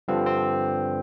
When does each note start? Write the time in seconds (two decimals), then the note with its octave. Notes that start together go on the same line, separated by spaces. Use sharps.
0.08 G2 D3 F3 C4
0.26 C4